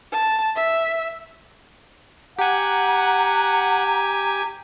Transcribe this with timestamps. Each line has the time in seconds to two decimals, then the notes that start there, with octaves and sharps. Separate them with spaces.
0.12 A5
0.56 E5
2.39 G4 F#5 G#5 A#5